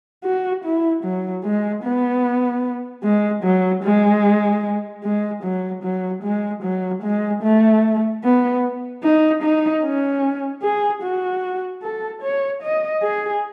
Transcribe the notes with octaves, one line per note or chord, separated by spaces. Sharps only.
F#4
E4
F#3
G#3
B3
G#3
F#3
G#3
G#3
F#3
F#3
G#3
F#3
G#3
A3
B3
D#4
D#4
C#4
G#4
F#4
A4
C#5
D#5
G#4